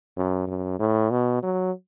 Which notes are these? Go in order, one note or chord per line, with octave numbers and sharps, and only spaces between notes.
F#2
F#2
A2
B2
F#3